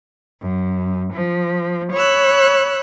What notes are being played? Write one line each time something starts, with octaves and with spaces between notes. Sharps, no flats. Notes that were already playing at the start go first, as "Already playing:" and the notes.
F#2
F3
C#5 B5 E6 F#6